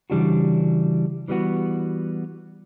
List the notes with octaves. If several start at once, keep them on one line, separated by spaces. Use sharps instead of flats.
C#3 E3 G3 D4 F#4
E3 G3 B3 F#4